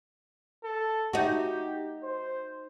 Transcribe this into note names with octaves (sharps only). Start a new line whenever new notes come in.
A4
D#4 F#4 G4
C5